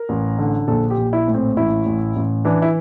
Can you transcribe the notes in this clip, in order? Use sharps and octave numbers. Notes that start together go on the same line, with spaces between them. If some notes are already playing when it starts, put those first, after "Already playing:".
Already playing: A#4
A1
D3
A#1 A4
G4
A#1
E4
A2
C4
A1 E4
A1
A1
E3 D4
E4